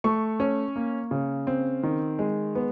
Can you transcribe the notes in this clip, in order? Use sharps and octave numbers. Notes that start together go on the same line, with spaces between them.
A3 C#6
C#4
A#3
C#3
C4
D#3
G#3
B3